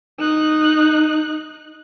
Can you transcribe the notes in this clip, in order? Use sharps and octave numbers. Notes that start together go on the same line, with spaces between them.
D#4 F#6